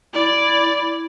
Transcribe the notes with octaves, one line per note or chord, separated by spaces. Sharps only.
E4 D5